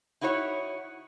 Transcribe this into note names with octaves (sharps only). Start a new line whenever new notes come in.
D#4 E4 F#4 B4 C#5